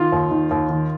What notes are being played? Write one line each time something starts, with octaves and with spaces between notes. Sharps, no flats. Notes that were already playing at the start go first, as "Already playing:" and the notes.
Already playing: D#3 F4
D#2
D#3
D#2
D#3